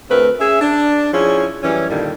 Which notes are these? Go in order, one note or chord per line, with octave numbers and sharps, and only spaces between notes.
D2 A3 C4 A#4 B4
C#4 G#4 E5
D4
F3 C#4 E4 G#4
F#2 E3 G3 C#4
G2 A#2 D3 D#3 G3